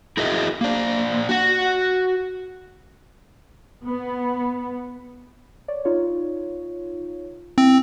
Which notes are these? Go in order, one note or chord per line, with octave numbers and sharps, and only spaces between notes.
E4 F#4 G#4 A#4 D#5 E5
A#3 D4
F#4 F#5
B3
C#5 D5
D#4 F4 C#5
C4 E4